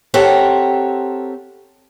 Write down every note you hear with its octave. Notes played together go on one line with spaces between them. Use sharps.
C4 G4 A4 A#4 C#5 F#5